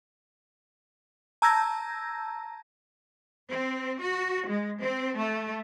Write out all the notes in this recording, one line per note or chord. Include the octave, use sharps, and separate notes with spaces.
A5 A#5 E6 G6 G#6 A#6
C4
F#4
G#3
C4
A3